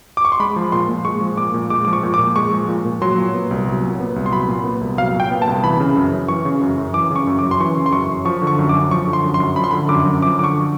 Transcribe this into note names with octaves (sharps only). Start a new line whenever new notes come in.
D6
C#6
C6
G#3 B5
F3
A#2 C6
A#2
G#3 C#6
F3
A#2 D6
A#2
G#3 D6
F3 D6
C#6
A#2
D6
A#2
G#3 C#6
F3
A#2
A#2
F#3 C6
A#2
B3
C2
F#3
A#2
B3
C2
C6
F#3 B5
A#2
B3
C2
F#3 F5
A#2
G5
B3
A5
C2
E3 B5
C#3
F#2
F#2
E3 C#6
C#3
F#2
F#2
E3 D6
C#3
C#6
F#2
D6
F#2
C6
E3 C#6
C#3
C6
F#2 C#6
F#2
F3 C#6
D3
C#6
F#2
D6
F#2
F3 C#6
D3
C6
F#2
C6
F#2
F3 B5
C6
D3 B5
F#2 D6
F#2
F3 D6
D3 D6
C#6